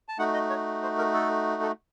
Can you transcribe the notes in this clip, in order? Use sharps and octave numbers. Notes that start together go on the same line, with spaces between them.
A5
A3 D#4 F#4 F#5
D#5
C#5
C5
A#4
A4
A4